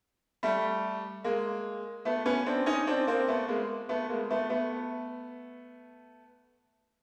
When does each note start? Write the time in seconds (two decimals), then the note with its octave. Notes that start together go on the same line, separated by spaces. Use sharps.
0.43 G3 A3
1.24 G#3 A#3
2.05 A3 B3
2.26 B3 C#4
2.46 C4 D4
2.66 C#4 D#4
2.87 C4 D4
3.07 A#3 C4
3.28 A3 B3
3.48 G#3 A#3
3.89 A3 B3
4.09 G#3 A#3
4.31 A3 B3
4.50 A3 B3